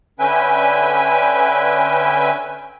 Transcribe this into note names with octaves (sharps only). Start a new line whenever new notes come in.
D3 C#4 B4 E5 G5 G#5